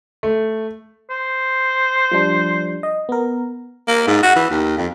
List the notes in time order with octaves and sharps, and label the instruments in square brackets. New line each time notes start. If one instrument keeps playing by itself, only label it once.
[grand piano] A3
[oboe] C5
[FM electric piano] F3 G3 D4
D#5
B3 A#4
[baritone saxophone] A#3
G#2
F#4
E3
D#2
F2